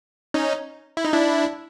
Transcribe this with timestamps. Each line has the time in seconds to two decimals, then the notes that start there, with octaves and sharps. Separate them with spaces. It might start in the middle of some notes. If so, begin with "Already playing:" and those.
0.34 C#4 D#4
0.97 E4
1.05 D#4
1.13 D4 E4